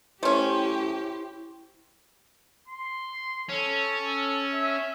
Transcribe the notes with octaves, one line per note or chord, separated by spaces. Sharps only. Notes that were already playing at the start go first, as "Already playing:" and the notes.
A3 C#4 E4 G4 C5
C6
C#4 A4
E5